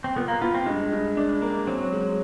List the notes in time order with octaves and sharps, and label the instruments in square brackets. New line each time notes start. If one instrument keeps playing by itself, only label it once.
[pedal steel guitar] C4
[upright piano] A#2 [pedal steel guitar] B3
[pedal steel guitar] A#3
[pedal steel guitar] B3 [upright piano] F4
[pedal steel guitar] C4
[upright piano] G2 [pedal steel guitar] G#3
[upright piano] G2
D4
A#3
[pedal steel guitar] F#3 [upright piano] C4
[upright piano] G#3